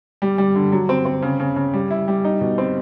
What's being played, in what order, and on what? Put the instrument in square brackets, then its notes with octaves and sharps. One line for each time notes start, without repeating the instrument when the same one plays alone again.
[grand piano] G3
G3
D3
F#3
C4
C4
C#3
C#3
C#3
G3
E4
G3
D#4
B2
C4